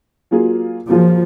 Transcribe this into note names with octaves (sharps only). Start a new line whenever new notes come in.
F#3 A#3 F4 G#4
F3 F#3 A#3 F4 G#4